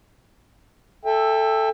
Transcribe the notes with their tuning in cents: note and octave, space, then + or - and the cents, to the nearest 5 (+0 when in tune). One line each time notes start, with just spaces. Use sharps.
A4 +5 E5 +0 G5 +35